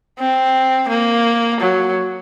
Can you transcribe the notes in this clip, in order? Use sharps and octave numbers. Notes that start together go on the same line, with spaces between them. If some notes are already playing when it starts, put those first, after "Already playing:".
C4
A#3
F#3